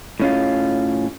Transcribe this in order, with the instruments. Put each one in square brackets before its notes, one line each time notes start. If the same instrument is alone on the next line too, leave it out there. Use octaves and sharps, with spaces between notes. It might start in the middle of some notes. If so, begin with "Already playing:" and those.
[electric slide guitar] A2 C#4 F4